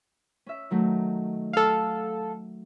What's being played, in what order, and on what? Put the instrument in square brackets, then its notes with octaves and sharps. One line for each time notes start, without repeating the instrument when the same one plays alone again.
[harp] C#4 E5
D#3 F#3 A3
[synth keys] A4 F5 [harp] E5